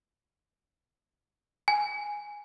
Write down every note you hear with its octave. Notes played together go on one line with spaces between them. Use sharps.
G#5